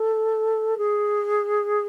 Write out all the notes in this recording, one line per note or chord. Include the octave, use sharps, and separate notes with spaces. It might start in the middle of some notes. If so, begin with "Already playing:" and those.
Already playing: A4
G#4